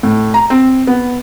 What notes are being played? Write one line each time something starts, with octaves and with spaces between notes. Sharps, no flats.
A2
A#5
C4
B3